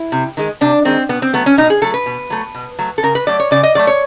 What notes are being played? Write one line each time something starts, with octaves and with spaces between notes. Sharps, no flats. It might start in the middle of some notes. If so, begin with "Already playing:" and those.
Already playing: E4
C3
D#3 G#3
C3 D4
D#3 G#3 C4
B2 B3
C4
F#3 A3 B3
C#4
B2 D#4
G#4
F#3 A3 A4
B4
B2
F#3 A3
B2
F#3 A3
A4
C#3 A#4
B4
F#3 A3 D5
C#5
C#3 D5
D#5
F#3 A3 D5
C#5